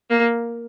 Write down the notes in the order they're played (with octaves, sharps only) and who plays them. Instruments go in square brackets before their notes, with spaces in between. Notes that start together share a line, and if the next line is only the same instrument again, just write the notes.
[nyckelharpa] A#3